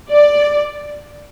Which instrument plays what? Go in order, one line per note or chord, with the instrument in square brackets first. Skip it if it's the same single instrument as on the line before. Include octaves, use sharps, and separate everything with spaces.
[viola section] D5